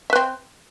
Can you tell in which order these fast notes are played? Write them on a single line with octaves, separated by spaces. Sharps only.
E5 B4 C4